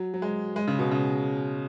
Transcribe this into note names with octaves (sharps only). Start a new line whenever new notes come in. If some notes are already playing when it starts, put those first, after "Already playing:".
Already playing: F#3
F#3
G#3
G#3
C#3
B2
C#3